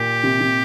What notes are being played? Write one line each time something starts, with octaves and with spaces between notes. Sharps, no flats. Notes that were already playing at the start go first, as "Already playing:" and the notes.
Already playing: A#2 G4
C3
C3